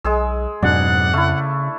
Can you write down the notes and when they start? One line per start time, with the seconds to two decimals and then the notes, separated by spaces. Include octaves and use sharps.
0.04 B1 G#3 G#4 E6
0.63 F2 G#2 B2 F#3 D4 F#5
1.13 C#3 A3 E4